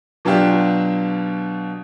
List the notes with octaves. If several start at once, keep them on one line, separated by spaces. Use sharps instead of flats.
B2 F#3 D4 F4 G4